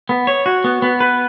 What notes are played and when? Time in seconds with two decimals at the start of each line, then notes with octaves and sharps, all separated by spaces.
0.09 B3
0.27 C#5
0.46 F#4
0.64 B3
0.82 B3
1.00 B4